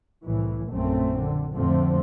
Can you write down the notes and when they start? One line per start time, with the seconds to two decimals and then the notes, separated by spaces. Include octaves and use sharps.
0.23 C2 A2 E3
0.70 A#1 F#2 A3 C4
1.21 D3
1.55 F2 A2 D3 F3 A3 C4